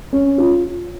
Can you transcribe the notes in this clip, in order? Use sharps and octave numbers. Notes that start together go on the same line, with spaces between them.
C#4
F4